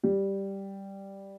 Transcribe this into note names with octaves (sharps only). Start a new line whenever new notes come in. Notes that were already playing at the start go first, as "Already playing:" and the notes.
G3